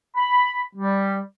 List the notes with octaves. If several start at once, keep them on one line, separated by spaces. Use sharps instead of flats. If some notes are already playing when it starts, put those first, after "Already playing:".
B5
G3